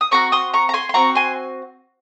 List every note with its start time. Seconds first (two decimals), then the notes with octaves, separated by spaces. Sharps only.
0.01 D#6
0.11 C4 F#4 A#5 C#6
0.32 C6 D#6
0.54 A#5 C#6
0.69 A#5
0.74 G#5 C6
0.89 C6
0.94 C4 F#4 A#5 C#6
1.15 G#5 C6